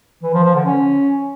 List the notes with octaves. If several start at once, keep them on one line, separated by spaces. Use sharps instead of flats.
E3
F3
F3
D3
C#4